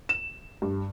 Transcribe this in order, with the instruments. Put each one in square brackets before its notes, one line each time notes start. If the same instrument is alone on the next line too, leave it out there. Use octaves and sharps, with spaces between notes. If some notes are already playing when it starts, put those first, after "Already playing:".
[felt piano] E7
G2